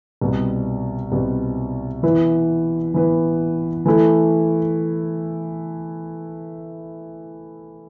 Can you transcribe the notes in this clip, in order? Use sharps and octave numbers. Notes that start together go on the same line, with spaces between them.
C2 B2 G3
C2 B2 G3
E3 B3 E4 B4
E3 B3 E4 B4
E3 A3 E4 A4